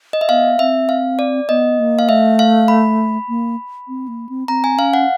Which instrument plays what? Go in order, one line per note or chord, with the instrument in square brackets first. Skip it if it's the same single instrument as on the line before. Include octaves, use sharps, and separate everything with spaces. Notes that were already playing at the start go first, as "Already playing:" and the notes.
[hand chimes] D#5
E5
[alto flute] B3 [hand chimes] F5
[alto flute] C4 [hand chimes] E5
[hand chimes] F5
D5
[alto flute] B3 [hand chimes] D#5
[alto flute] A#3
[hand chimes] F5
[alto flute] A3 [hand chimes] E5
[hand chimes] F5
B5
[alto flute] A#3
C4
A#3
C4
[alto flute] C4 [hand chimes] A#5
[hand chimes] G#5
[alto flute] C#4 [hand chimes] F5
[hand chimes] F#5